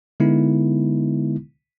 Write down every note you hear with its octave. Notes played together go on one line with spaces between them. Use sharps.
D3 G#3 B3 D#4 E4